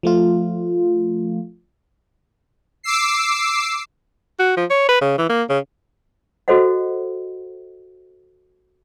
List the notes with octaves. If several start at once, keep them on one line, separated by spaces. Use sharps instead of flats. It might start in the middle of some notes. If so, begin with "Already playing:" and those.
F3 A3 F4
D6 E6 C7
F#4
F3
C#5
B4
C#3
E3
A#3
C#3
F#4 A4 C5 D#5 F#5